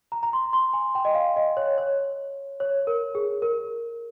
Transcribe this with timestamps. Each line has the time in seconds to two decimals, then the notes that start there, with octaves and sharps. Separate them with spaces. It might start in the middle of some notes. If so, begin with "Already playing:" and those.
0.12 A#5
0.23 A#5
0.33 C6
0.53 C6
0.73 G#5
0.95 G5
1.05 D#5
1.15 F5
1.36 D#5
1.57 C#5
1.78 C#5
2.60 C#5
2.87 A#4
3.15 G#4
3.42 A#4